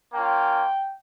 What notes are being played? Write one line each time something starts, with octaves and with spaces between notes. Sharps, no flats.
A#3 C#4 F4 G5